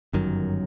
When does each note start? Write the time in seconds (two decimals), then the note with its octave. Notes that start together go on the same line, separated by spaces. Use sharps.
0.13 G1 F#2 D#3 F#3